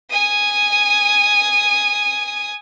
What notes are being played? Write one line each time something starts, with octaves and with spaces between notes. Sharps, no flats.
G#5 D#6